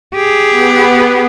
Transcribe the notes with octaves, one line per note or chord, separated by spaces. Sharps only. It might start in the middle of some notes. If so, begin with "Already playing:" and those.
G4 G#4
B3